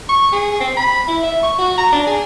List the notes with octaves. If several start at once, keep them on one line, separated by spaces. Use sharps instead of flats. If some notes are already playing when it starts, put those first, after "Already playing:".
C#6
G#4
C4
B5
E4
E5
C#6
F#4
A#5
D4
G#4